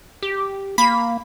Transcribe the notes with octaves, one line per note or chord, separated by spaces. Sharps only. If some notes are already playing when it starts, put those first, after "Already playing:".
G4
A#3 B5